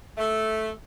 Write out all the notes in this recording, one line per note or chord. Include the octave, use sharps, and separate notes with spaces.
A3